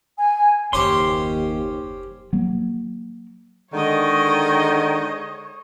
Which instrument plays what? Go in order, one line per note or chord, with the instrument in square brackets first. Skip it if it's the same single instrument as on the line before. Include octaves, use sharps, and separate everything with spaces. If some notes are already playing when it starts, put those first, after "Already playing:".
[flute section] G#5
[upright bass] F#1 [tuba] D#2 [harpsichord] C#4 G4 C5 [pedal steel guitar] C6
[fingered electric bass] F#3 A#3
[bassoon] D3 [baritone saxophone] D#3 [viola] G#3 D#5 [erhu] C#5